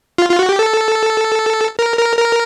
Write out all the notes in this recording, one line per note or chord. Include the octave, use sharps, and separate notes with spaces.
F4
F4
F#4
G4
A4
A#4
A#4
A#4